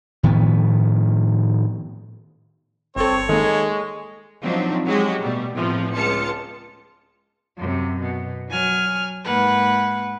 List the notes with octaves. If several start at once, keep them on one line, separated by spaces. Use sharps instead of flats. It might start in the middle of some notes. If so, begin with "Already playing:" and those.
A2 D#3 F3 B3
G1 C4 A4 C#5
D#3 G#3 A#3 A4
F3 F#3 C4 D4 D#4
F#3 G#3 F#4 G4
B2 G3 A3
E2 A2 C3 F3
C#2 F4 A5 C#7
F#2 C3
B2
F#3 G#5 F6
G#2 A#3 B4 F#5